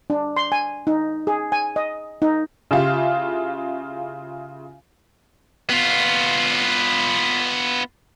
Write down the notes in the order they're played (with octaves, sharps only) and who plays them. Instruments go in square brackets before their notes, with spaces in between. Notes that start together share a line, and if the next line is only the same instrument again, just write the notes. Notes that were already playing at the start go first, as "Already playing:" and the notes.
[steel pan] D4
C6
G#5
D#4
G#4
G#5
D#5
D#4
[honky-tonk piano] C#3 E4 F4 G4
[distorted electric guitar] B3 F4